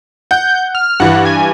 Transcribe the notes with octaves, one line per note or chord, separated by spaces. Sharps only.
F#5 G6
F6
G2 E3 F#5
G#5